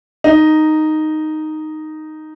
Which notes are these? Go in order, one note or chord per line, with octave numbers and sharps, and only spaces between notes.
D#4